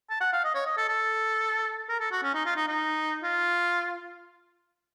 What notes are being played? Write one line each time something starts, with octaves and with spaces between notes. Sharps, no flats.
A5
F#5
F5
D#5
C#5
D#5
A4
A4
A#4
A4
F#4
C#4
D#4
F4
D#4
D#4
F4